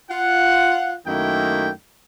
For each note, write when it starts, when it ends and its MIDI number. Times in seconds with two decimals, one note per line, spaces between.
0.10 0.95 65
0.10 0.95 78
1.07 1.71 42
1.07 1.71 51
1.07 1.71 57
1.07 1.71 58
1.07 1.71 64
1.07 1.71 79